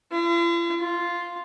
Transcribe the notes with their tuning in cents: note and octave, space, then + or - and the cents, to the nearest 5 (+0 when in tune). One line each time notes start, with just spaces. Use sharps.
F4 -45
F4 +0